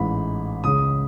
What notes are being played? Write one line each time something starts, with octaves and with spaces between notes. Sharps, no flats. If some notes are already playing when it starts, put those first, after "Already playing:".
Already playing: A1 G#2 E3 G#3 B5
C#2 C#3 G#3 C#4 D#6